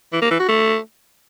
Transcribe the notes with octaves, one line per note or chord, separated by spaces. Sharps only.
E3
A#3
E3
F#4
A3